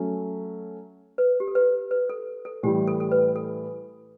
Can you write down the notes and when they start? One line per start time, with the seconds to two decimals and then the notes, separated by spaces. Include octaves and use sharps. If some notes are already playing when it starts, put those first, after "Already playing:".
Already playing: F#3 A3 C#4
1.18 B4
1.40 G4
1.48 A4
1.55 B4
1.91 B4
2.10 A4
2.45 A4
2.63 A2 E3 G3 G4
2.87 A4
3.00 A4
3.12 B4
3.36 A4